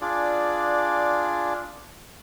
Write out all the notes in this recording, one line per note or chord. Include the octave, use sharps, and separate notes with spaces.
D4 F4 G#4 D5